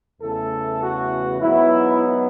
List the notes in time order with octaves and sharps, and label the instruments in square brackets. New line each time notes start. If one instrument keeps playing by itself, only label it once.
[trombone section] E2 C#3 E3 A3 A4
F#4
G#2 F#3 B3 E4